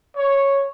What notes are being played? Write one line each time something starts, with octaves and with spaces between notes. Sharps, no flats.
C#5